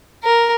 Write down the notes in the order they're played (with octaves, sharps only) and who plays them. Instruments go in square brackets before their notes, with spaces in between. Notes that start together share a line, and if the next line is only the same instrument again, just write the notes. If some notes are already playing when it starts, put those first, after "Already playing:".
[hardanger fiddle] A#4